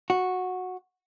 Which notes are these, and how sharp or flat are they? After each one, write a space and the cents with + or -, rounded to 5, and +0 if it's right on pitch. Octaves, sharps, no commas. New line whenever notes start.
F#4 -10